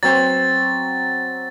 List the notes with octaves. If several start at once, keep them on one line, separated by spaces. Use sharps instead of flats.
F#3 C4 A6